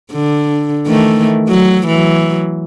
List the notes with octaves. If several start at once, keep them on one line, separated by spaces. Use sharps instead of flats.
D3
D#3 E3 A3
F#3
E3 F#3